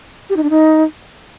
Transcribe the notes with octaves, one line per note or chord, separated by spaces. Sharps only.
G4
D#4
D4
D#4